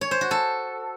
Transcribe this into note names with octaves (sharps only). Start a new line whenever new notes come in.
C#5
C5
F#4
A4